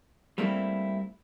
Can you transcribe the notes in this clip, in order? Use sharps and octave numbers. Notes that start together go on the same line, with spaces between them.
G3 A3 A#3 C4 E4